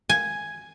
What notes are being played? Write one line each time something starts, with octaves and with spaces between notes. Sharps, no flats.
G#5